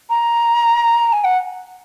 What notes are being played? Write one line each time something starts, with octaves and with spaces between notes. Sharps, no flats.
A#5
G#5
F#5